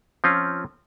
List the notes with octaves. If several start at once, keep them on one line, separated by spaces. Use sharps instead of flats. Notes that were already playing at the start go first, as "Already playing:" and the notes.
F3 C4 C#4 F4